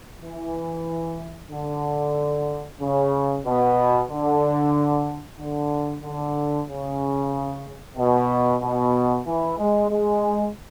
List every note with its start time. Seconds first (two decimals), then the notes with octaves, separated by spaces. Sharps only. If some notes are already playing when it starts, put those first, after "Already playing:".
0.22 E3
1.51 D3
2.80 C#3
3.45 B2
4.09 D3
5.38 D3
6.02 D3
6.67 C#3
7.96 B2
8.61 B2
9.25 E3
9.58 G#3
9.90 G#3